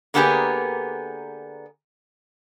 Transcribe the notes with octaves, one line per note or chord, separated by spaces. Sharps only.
D3 A#3 B3 G4 G#4 A#4